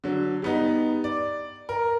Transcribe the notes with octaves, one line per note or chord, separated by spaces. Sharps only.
D3 F#3
G3 B3 D#4
D5
A#4